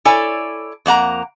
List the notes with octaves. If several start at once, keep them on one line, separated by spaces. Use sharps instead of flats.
E4 A4 C#5 D5 G#5
F2 A#3 F#5 A#5